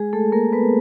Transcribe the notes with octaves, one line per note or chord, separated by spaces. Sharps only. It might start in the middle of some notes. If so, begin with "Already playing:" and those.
Already playing: G#3 G#4
A3 A4
A#3 A#4
B3 B4